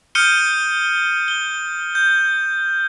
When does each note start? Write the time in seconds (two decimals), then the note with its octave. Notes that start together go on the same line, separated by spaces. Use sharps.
0.15 D#6 F6 G6 C#7 D#7 G7
1.28 G7
1.95 G6